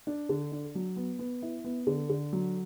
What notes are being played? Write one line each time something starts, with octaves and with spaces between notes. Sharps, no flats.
D4
D3
D4
F#3
B3
B3
E4
B3
D3
D3
F#3